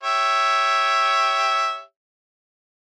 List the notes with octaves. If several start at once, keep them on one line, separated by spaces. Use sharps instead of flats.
G4 C#5 E5